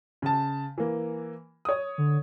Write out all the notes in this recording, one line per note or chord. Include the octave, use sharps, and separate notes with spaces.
C#3 A5
E3 A#3
C#5 D#6
D3